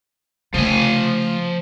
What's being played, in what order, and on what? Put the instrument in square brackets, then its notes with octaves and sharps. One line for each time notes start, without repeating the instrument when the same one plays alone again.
[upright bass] C#3 A3 [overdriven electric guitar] F3 G#5